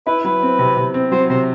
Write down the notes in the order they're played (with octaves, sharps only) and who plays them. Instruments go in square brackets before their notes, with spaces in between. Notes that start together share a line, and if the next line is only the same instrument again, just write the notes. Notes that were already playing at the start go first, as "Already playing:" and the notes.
[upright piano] E4 [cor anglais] B4
[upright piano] F#3 [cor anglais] B4
[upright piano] C4
C3
C3
C4
[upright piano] F#3 [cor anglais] C5
[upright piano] C3 [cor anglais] C5